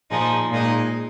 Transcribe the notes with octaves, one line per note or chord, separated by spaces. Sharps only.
A#2 F3 G#3 D#4
A#2 G#3 D#4 G#4